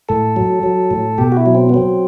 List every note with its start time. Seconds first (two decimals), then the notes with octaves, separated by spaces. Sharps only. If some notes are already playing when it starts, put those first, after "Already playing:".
0.09 A2 A4
0.36 F#3
0.63 F#3
0.91 A2
1.18 B2 G4
1.32 F#4
1.37 E4
1.46 F#3
1.55 C4
1.69 B3
1.74 F#3 C4